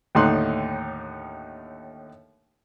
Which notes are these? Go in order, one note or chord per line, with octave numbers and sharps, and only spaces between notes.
D#2 A2 D3 D#4 C6 F#6